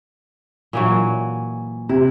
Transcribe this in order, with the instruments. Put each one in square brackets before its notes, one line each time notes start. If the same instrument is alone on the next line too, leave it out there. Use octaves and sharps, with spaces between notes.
[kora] A#2 E3 F#3
[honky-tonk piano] C3 [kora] E4